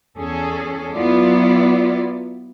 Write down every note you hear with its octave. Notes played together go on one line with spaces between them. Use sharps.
E2 C#4 G#4 A4
F#3 B3 E4 F4 D5